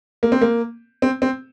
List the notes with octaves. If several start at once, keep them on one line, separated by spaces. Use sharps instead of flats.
A#3
C4
A#3
C4
C4